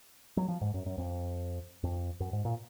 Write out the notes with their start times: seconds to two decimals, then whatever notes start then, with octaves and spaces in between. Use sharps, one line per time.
0.37 F#3
0.48 F3
0.61 G#2
0.74 F#2
0.86 F#2
0.98 F2
1.83 F2
2.20 F#2
2.33 G#2
2.45 A#2